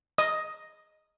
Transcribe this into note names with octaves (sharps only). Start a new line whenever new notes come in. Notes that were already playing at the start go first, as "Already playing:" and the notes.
D#5 D#6